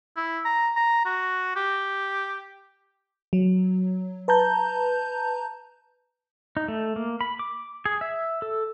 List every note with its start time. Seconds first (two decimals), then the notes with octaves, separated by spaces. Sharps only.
0.16 E4
0.45 A#5
0.76 A#5
1.05 F#4
1.56 G4
3.33 F#3
4.28 B4 A5 A#5 G6
6.57 D#4
6.68 A3
6.96 A#3
7.21 B5
7.39 D6
7.85 G#4
8.01 E5
8.42 A4